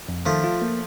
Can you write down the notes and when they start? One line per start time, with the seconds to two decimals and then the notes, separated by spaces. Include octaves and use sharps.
0.09 F2
0.26 D#3 F3 A3
0.44 F4
0.62 A#3